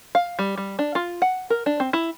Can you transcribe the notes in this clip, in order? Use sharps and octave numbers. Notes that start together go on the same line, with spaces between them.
F5
G3
G3
D4
F4
F#5
A#4
D4
C4
E4